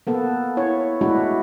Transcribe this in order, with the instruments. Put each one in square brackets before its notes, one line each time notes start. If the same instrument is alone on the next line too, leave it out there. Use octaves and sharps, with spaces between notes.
[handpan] A#3 B3 A4
E4 C#5
G#3 A3 D4 E4 F#4